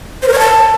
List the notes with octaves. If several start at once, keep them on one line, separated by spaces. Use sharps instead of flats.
C5
A#4
C#5
A5